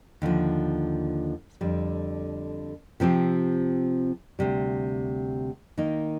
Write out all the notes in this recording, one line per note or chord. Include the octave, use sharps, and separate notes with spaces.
D#2 D3 F3
F2 D3 G3
C3 F3 C4 G4
D2 C3 G3
D#3 A#3 D#4